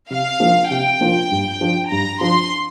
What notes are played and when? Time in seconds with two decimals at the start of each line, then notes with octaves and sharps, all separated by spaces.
0.10 C3 F5
0.40 F3 A#3 D4 F4
0.71 C3 G5
1.01 F3 A#3 D4 F4
1.32 G2
1.61 F3 D4
1.91 G2 A#5
2.21 F3 D4 C6